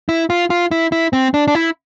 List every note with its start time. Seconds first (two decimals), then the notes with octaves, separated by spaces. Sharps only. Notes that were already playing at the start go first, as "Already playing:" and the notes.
0.09 E4
0.30 F4
0.50 F4
0.71 E4
0.92 E4
1.13 C4
1.34 D4
1.48 D4
1.55 E4